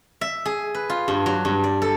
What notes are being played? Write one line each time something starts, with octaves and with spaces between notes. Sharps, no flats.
E5
G#4
B4
F4
G2
F#3
G2
D5
A4